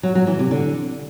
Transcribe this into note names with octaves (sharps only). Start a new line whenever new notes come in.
F#3
F#3
E3
C3
D3